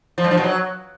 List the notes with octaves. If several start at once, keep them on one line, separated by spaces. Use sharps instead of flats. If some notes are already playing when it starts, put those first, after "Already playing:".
F3
G2
F3
B2
F#3